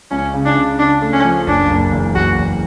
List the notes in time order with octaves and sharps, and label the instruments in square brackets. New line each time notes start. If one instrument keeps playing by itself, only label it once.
[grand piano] C#2 [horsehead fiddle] C#4
[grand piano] C#3
[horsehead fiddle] D4
[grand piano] C#3
[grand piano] C#3 [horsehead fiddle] D4
[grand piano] A3
[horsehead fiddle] C#4
[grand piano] F3
[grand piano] F#1 [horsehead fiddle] D4
[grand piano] F#1
E2
[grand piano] F#1 [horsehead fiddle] F#4
[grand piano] E2